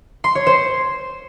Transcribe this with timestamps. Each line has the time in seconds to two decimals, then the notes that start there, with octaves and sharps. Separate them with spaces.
0.24 C6
0.35 C#5
0.47 C5